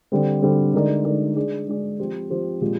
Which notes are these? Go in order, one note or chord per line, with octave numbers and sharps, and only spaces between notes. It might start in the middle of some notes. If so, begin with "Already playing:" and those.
D3 G3 C4
D3 G3 C4
D3 G#3 D#4 A#4 D5
D3 G#3 D#4 A#4 D5
G#3 D4 G#4 D5
G#3 D4 G#4 D5
F3 C4 G4 C5
F3 C4 G4 C5
A#2 F3 G#3 C4 G4